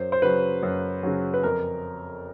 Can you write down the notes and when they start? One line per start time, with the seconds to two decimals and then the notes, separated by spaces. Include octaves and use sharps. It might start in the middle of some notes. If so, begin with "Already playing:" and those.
Already playing: F#2 C5
0.12 C5
0.22 C#3 F#3 B4
0.63 F#2
1.03 C#3 F#3
1.34 B4
1.43 F2 A#4